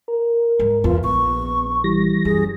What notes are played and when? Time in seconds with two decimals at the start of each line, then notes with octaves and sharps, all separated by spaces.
0.08 A#4
0.59 G#2
0.84 E2 B3 F4
1.04 A#1 C#6
1.84 E3 G3 A#6
2.25 F#2 G#4